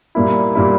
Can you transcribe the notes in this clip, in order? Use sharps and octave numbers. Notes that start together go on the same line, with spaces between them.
A#2 G3 A#3 E4
A#2 G3 A#3 E4